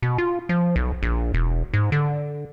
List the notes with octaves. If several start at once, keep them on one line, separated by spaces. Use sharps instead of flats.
B2
F4
F3
B1
A#1
E1
G#2
D3